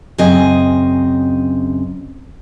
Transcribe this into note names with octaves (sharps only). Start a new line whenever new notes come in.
F#2 C#3 C4 D#5 G#5